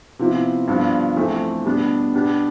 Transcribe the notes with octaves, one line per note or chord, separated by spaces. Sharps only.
C3 F3 B3 E4
G2 F3 B3 D4
F2 E3 A3 C4
B2 G3 B3 D4
B2 B3 D4 G4